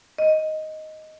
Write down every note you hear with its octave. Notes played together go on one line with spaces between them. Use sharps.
D#5